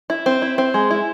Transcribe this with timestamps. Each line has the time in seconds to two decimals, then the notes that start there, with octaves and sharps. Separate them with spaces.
0.10 E4
0.26 C4
0.42 E4
0.58 C4
0.74 G#3
0.90 E4